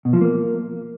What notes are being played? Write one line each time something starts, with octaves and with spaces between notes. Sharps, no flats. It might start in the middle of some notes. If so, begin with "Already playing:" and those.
B2
F3
A#3